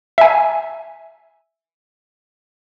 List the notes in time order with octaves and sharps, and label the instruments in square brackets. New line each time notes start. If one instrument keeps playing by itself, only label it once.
[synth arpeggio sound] E5 G#5